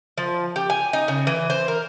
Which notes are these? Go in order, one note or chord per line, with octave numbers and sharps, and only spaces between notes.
F3
G4
G#5
D#4
C#3
E3
C5
A#4